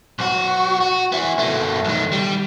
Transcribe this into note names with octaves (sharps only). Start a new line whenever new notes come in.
B1 F#4
F#4
B3 E4
B2 A3
B1 D#3
G3